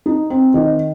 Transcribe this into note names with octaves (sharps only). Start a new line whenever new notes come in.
D#4
C4
D#3